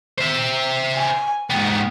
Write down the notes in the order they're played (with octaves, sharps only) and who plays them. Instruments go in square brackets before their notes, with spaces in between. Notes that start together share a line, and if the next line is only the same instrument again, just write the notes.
[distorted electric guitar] C5 E5
[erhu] G#5
[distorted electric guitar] G#2 B3 [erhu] G5